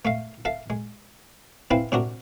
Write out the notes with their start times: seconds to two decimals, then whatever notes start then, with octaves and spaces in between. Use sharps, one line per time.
0.05 A3 E5 F5
0.45 A4 E5 F5
0.70 G#3
1.71 C4 E4 B4 F5 G#5
1.92 C3 D4 F#4 A#4